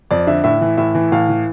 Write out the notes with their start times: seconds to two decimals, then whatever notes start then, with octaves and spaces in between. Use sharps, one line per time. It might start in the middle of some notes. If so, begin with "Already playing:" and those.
0.11 F2 D5
0.27 D3 E5
0.44 A2 E5
0.61 E3
0.77 A2 E5
0.95 E3
1.12 A2 F5
1.29 E3